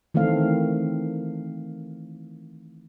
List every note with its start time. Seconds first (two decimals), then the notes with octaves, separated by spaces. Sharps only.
0.14 D#3 E3 A3 C4 F5